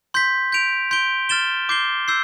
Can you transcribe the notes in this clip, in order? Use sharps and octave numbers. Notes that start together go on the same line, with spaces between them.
C6 G6 B6
G6 D7 F7
C6 G6 D7 G7
F6 A6 E7 G7
D6 G6 C7 G7
E6 G6 C7